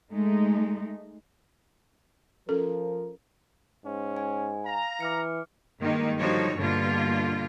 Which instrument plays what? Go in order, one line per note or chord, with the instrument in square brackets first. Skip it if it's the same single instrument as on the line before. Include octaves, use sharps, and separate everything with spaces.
[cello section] G#3 A3 D#4
[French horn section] F3 A#4 [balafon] C#4 A4
[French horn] G#2 [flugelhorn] C#4
[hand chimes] G#5
[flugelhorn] F5 [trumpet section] A#5
[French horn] E3 [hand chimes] D6 F6 C#7
[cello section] G2 D#3 G#3 A#3 D#4
D3 F3 G3 D#4 F#4 C#5
G2 B2 D3 A#3 F4